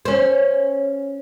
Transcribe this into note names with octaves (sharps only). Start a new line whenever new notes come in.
C#4 C5